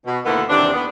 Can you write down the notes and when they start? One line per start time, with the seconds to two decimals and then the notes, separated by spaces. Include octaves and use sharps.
0.06 B2
0.25 D2 D#3 A#3 B3 E4 A4
0.49 D#2 C3 E3 C4 D4
0.73 B3